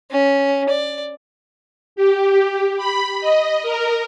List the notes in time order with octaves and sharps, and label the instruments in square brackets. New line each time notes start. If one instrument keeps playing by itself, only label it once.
[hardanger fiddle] C#4
D5
[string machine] G4
B5
D#5
A#4